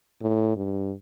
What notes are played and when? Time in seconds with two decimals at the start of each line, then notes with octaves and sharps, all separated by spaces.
0.21 A2
0.56 G2